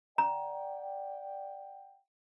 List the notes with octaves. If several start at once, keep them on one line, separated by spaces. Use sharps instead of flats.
D5 F#5 G5 A#5